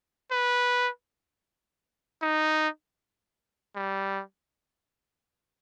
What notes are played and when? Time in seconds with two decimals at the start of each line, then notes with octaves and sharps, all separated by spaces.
0.31 B4
2.22 D#4
3.76 G3